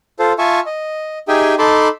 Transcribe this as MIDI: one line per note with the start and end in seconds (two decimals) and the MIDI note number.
0.19 0.33 65
0.19 0.33 69
0.19 0.33 72
0.38 0.60 65
0.38 0.60 76
0.38 0.60 80
0.38 0.60 81
0.38 0.60 85
0.66 1.19 75
1.28 1.55 63
1.28 1.55 67
1.28 1.55 68
1.28 1.55 76
1.28 1.55 79
1.28 1.55 80
1.59 1.88 63
1.59 1.88 69
1.59 1.88 81
1.59 1.88 83
1.59 1.88 84
1.59 1.88 86